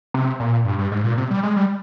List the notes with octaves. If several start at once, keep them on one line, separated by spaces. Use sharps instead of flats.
C3
A#2
G2
G2
G#2
A#2
C3
G3
G#3
G3